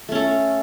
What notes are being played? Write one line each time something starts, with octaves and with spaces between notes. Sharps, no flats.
A3 C#4 A4